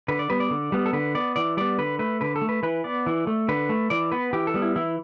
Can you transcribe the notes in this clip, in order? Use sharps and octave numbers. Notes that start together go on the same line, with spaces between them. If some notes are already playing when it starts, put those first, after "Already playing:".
D3 B4
D5
G3 B3 B4
D5
D3
G3 B3
A4
D3 B4
B3 D5
E3 D5
G3 B3 D5
D3 B4
A3 B4
D3 B4
A4
A3
B4
E3 B4
B3 D5
E3
A3
D3 B4
A3
E3 D5
B3 B4
E3 G4
A4
G3 B3
E4
E3 E4